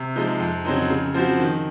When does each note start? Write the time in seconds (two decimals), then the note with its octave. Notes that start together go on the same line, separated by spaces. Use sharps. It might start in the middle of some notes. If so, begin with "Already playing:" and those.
Already playing: C3
0.16 F3 G#3 D#4
0.40 F2
0.65 C#3 F#3 C4 D#4
0.90 C#3
1.14 F3 C4 F#4
1.39 D#3